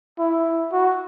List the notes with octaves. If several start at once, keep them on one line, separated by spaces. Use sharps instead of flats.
E4
F#4